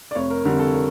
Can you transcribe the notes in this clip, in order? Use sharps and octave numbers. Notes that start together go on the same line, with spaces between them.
D5
F1 C#5
A#4
F2 D3 G3 A#4
A4
A#4